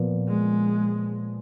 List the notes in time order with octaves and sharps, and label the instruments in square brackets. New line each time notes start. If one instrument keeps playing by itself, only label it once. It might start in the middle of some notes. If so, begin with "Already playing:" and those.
Already playing: [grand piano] A#2 F3 B3
[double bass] G#3